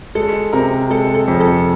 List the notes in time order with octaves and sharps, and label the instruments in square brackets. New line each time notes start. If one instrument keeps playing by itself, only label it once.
[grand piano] G#3 [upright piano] A4
[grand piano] C3 [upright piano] A#4
[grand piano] G#3 [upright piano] A4
[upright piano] A4
[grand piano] F2
[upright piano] A4